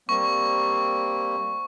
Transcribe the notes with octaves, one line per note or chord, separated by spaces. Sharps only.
G3 A#3 C4 C#6